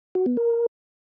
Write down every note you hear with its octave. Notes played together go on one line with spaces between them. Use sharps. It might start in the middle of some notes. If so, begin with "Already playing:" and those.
F#4
B3
A#4